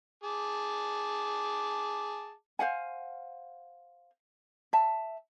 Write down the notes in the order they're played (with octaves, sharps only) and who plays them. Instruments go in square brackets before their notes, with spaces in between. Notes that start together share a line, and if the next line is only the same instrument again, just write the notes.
[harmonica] G#4 A5 D6
[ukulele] C5 F5 F#5 G#5
E5 A5